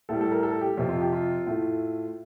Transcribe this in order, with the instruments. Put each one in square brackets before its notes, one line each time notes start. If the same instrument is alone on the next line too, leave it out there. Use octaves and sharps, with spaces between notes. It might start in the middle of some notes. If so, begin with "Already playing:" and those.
[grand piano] A2 G3 A4
A4
A#4
A4
G4
F2 C3 F3 F4
F4
G4
F4
A2 A3